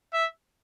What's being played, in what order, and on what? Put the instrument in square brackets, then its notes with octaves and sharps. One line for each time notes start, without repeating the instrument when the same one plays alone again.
[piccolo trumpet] E5